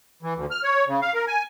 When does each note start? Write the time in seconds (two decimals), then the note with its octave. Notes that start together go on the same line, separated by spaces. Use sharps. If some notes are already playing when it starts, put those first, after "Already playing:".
0.23 E3
0.36 D2
0.51 F6
0.64 C#5
0.88 C#3
1.02 F5
1.14 A#4
1.27 G#5